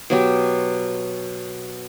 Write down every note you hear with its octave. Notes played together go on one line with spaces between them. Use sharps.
B2 F#3 G4